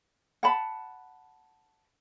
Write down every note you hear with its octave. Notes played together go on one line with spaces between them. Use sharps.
F#5 A5 B5